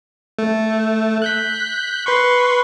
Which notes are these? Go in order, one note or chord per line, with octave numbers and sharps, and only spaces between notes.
A3
F#6 G6 B6
B4 C6 C#6